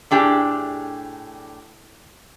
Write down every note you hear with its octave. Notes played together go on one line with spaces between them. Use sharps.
A2 D4 G4 G#4